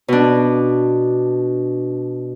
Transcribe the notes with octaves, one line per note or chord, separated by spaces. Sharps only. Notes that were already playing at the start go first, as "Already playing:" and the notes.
B2 D4